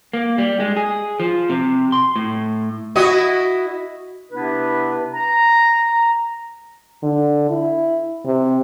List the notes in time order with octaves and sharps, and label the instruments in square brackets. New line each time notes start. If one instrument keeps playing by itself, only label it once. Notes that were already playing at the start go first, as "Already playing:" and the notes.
[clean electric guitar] A#3
G3
G#3
G#4
F3
C3
C6
A2
[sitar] E4 F#4 D#5
[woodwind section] C3 B3 D4 E4 B4
A#5
[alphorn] D3
E4
C3